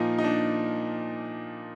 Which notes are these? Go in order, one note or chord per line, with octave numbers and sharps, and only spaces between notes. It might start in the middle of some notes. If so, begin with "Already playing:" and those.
Already playing: A#2 F3 A#3 D#4
D#4
D4